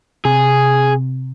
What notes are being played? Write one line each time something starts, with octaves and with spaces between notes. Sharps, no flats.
C3 G#4